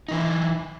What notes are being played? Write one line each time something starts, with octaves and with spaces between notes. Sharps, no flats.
E3 D#4 E4